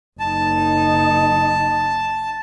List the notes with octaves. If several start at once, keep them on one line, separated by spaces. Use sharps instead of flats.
F#1 D#4 A5